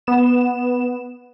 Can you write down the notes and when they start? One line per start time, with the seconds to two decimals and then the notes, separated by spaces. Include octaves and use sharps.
0.07 B3 E7